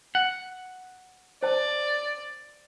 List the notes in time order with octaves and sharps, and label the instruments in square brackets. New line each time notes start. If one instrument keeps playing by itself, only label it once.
[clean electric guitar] F#5
[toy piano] C5 A5 [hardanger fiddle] D5